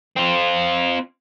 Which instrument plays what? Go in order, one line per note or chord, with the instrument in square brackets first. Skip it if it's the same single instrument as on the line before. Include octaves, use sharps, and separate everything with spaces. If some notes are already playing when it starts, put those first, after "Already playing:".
[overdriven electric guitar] C4 F4